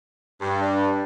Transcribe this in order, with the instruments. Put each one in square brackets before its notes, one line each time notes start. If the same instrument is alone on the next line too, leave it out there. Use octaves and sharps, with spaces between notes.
[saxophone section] G2
[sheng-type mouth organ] D4